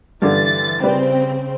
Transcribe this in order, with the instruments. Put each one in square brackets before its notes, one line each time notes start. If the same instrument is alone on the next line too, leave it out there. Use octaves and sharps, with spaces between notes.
[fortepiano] G2 D3 [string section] E3 A6
[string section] C#3 C4 [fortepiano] G3 B4 D5